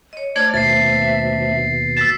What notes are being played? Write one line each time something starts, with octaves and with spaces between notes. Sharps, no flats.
C#5 D#5
A3 D4 C5 D5 F6 G#6
D#2 B2 E5 A6 C7
E6 A6 B6 E7